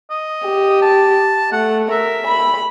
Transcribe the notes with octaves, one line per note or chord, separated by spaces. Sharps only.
D#5
G4
A5
A3 F#5
A#4 E5
B5